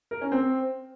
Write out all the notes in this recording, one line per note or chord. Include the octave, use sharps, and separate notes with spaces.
A#4
C#4
C4